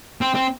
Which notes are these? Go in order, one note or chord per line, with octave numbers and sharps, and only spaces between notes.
C4
C4